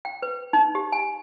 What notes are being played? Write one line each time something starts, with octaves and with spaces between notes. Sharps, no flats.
G5
B4
D#4
G4
G#5